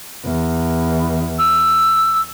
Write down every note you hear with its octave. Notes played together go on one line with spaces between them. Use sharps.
E2
E6